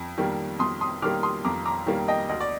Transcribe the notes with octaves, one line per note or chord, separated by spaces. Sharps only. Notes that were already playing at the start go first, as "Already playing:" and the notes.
Already playing: F2
D#3 G3 A#3
F2 C6 D#6
C6 D#6
D#3 G3 A#3 D6 F6
C6 D#6
F2 A#5 D6
A#5 D6
D#3 G3 A#3
D#5 G5
D2 D#5
D5